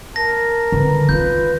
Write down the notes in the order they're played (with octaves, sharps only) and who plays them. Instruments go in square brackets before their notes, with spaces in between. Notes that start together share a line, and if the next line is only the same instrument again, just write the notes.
[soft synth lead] A#4 [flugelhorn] A5 [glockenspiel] A#6
[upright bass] D3 [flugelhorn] B4
[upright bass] D#3 C#4 [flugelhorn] F4 [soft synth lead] B4 [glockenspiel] G6